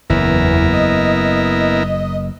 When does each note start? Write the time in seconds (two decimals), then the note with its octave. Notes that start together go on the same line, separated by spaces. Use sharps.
0.10 F#1 E2 E3 B3 E4 A#4
0.74 D#5